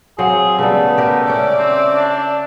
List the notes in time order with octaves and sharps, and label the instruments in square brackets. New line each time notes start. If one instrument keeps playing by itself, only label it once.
[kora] F#3 C4 F5 [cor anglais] G#4
[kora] C#3 G3 [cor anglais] A3 [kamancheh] B3
[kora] G4 A#4
[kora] C#4 C#5 [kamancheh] D5 E5
[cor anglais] C4
D4